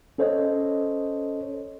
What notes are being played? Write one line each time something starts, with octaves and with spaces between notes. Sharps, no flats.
C#4 A4 C5 C#5 D#5